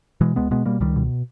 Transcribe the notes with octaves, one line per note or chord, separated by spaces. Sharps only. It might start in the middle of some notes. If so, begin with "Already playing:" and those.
B2 E3 G#3
C#2 G#3 B3
B2 G#3 B3
B2 G3 A#3
C#2 D#3 G3
B2